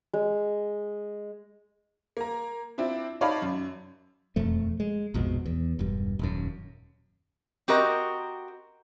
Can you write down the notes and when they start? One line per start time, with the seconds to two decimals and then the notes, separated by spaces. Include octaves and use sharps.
0.13 G#3
2.17 A#3 A#5
2.78 C4 D4 E4 F4
3.21 D#4 C#5 D5 F5 A5 B5
3.42 F#2
4.36 E1 F2 F3 A3
4.80 G#3
5.14 A#1 F2 G#2 B2
5.46 E2
5.79 E1 G2
6.19 D#1 F#2
7.68 C4 F#4 G4 A#4 D#5